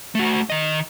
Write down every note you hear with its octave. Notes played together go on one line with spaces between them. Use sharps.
A3 F#4
D#3 D#5